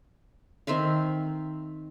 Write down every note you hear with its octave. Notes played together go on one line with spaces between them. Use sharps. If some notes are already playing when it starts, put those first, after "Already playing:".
D#3 C4 E5 F5